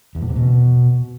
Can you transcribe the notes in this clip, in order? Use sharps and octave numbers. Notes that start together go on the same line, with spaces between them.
E2
A#2
C3
B2